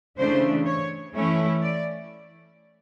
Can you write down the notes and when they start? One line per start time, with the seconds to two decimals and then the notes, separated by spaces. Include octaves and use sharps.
0.18 C#3 E3 A3 D4 C5
0.66 C#5
1.15 E3 A3 C#4 E4 C#5
1.62 D5